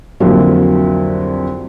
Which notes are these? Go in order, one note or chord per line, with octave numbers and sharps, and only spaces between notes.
C2 F2 D3 F#3 A#3